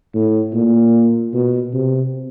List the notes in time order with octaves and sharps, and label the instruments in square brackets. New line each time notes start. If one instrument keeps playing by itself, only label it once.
[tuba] A2
A#2
B2
C3